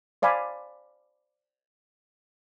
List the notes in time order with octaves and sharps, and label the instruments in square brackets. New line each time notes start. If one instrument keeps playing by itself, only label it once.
[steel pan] C5 D5 F5 G#5 B5